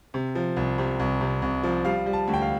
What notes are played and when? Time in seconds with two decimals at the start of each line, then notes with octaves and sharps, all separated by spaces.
0.14 C3
0.35 F3
0.56 C2
0.78 C3
0.99 C2
1.21 C3
1.42 C2
1.63 F3
1.85 G3 F5
2.06 G3
2.13 A5
2.28 D2
2.34 G5
2.42 F5